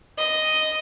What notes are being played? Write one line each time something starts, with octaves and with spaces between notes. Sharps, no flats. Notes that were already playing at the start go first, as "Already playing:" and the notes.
D#5